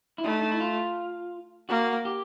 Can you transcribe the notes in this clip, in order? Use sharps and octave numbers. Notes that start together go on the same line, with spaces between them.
E4
A3 D#4
D#4
E4
F4
A#3 F#4
G4